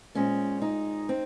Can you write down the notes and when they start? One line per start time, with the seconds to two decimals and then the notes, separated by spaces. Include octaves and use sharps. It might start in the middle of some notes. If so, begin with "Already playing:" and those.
0.15 A#2 G#3 C4 C#4
0.62 D#4
1.09 C4